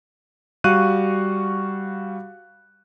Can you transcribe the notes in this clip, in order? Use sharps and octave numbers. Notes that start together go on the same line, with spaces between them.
G3 F#4 F5 C#6 F#6 D#7